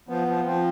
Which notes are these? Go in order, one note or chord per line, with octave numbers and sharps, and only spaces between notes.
F3 B3
F3
F3 C4